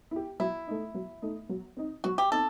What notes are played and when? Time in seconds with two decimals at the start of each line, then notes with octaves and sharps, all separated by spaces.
0.11 E4 G4
0.40 F#3 E4
0.67 A3 D#4
0.94 F#3
1.22 A3 D#4
1.49 F#3
1.77 C4 D#4
2.04 F#3 F#4
2.18 G4
2.32 C4 D#4 A4